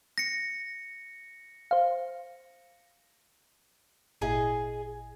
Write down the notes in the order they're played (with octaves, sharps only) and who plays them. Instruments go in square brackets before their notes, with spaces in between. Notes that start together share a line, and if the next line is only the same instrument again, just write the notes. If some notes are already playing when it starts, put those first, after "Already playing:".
[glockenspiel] A#6 C#7
[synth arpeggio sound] C5 F5
[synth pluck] G#1 A#2 E4 [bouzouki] G#4 D#5